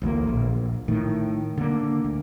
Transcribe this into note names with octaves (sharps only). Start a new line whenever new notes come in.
A1 D2 A#3
A#1
A2 D#3
D3 A#3
D2